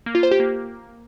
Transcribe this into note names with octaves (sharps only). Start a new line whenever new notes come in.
A#3
F4
C5
G4
A#3